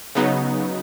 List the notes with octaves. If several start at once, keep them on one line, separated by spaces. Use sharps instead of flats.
C#3 F#3 B3 D#4